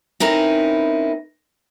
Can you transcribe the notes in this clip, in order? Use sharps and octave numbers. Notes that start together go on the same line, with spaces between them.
C4 C#4 D#4 E4 A#4 B4